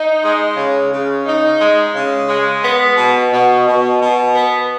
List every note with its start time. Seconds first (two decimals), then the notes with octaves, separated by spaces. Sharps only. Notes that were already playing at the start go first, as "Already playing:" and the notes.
Already playing: D#4
0.23 G#3
0.57 C#3
0.92 C#3
1.26 D#4
1.60 G#3
1.95 C#3
2.29 G#3
2.64 B3
2.97 B2
3.32 B2
3.67 B2
4.01 B2
4.35 B3